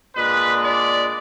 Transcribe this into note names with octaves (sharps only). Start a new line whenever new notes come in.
A#2 G#3 D4 B4
D5